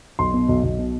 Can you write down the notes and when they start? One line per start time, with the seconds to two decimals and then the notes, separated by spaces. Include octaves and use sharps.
0.19 B1 C6
0.34 B2
0.49 B1
0.63 B1
0.79 B2